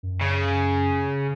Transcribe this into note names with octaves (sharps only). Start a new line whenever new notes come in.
F#2
C#3